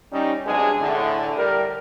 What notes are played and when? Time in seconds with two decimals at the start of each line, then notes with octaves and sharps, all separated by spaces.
0.12 G3 C#4 D#4
0.45 B1 C3 G#3 D4 G#4
0.81 A2 D3
1.36 G3 A#4